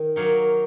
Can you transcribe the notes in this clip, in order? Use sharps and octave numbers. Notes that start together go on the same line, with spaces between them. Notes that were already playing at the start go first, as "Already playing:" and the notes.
Already playing: D#3
F#3 A#3 D#4 C#5 F5